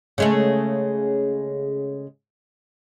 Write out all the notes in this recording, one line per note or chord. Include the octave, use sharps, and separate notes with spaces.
C#3 G#3 A3